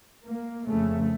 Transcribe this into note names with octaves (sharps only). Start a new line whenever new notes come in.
A#3
F2 C#3 A3